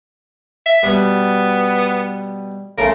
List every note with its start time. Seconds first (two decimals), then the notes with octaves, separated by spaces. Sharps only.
0.66 E5
0.83 B2 G3 B3
2.78 C#3 A3 A#4 C6